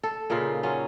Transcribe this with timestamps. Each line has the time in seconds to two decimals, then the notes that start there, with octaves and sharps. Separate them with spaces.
0.03 A4
0.30 A#2 C#3 D#4 F4
0.63 F#3 C#4 F4